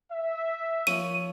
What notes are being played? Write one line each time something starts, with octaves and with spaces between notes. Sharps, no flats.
E5
D#2 F3 C#5 D#7